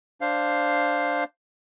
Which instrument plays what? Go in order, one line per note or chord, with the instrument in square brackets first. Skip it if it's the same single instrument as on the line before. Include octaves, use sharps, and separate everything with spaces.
[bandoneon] D4 C5 F5